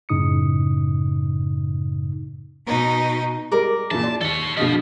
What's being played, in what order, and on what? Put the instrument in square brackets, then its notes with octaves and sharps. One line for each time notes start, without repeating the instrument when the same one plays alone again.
[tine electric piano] F#2 A2 C#3 D#4 D#6 C#7
[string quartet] B2 D#4
[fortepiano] G3 G#3 [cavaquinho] A#4 D5
[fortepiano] A#2 C#3 E3 [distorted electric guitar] A5
[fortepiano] D5 [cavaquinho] C6
[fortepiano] D#2 [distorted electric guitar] A4 C#5
[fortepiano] B2 D3 D#5 [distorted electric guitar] F3